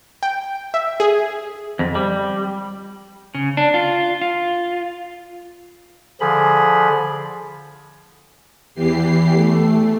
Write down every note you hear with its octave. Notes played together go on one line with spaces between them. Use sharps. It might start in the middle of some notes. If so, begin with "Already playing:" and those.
G5
E5
G#4
F2
G3
C#3
D4
F4
F4
D3 F3 G#4 B5
E2 E3 G4 C7
A3